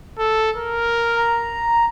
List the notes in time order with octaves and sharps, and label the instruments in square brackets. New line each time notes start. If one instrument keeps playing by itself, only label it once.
[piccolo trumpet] A4
A#4
[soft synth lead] A#5